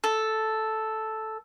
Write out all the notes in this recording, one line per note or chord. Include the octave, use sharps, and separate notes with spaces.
A4